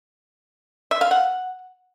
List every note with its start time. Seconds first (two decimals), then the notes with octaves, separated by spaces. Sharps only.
0.91 E5
1.01 F5
1.11 F#5